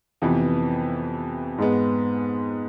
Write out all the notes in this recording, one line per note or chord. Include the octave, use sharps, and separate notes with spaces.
F2 C3 E3 B3
G#2 G#3 B3